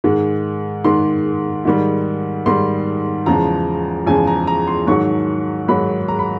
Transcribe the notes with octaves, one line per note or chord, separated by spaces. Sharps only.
G#2 D#3 G#3
G#2 D#3 G#3 C6
G#2 D#3 G3
G#2 D#3 G3 C6
E2 C#3 F3 G#3 A#5
E2 C#3 F3 G#3 G#5
A#5
A#5
C6
G#2 D#3 F#3 C#6
G#2 D#3 F#3 B5
A#5
B5